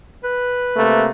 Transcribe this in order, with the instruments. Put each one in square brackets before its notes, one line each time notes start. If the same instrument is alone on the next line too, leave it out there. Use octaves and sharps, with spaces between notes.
[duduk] B4
[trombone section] C3 A3 A#3